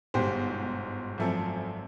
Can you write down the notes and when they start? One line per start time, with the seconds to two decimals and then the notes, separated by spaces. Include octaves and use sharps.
0.14 G1 G#2 B2 G4 C5
1.18 G#1 F#2 F3 A3 C4